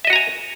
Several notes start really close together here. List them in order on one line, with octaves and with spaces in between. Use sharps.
E5 D#5 F#4 A#5 G#5